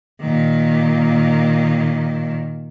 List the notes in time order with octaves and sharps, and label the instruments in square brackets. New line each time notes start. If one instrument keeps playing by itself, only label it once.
[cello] A#2 D#3